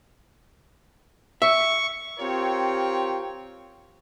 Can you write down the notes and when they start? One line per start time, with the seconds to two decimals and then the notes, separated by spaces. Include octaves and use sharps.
1.42 E5 C#6
2.19 C4 F4 G4 A#4 C#5